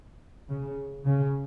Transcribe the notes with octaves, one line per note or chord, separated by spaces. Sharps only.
C#3
C#3